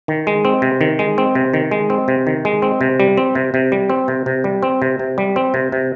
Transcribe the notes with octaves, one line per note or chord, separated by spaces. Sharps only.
D#3
G#3
C4
C3
D#3
G#3
C4
C3
D#3
G#3
C4
C3
D#3
G#3
C4
C3
G3
C4
C3
C3
G3
C4
C3
C3
G3
C4
C3
C3
G3
C4
C3
C3